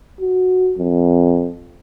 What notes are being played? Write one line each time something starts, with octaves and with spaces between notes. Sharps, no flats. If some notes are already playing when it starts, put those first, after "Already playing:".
F#4
F2